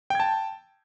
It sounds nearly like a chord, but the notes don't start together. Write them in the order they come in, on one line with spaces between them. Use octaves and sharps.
G5 G#6 A5